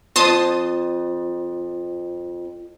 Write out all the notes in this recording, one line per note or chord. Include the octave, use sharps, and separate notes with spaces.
F2 A5 C6 D#6